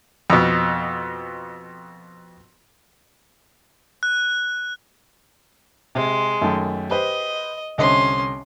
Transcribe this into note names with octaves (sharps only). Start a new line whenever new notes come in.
F2 B2
F#6
C3 G#3
F#2 D#3 A3
G4 B4 C5 D#5
C2 D3 C#4 D#5 C6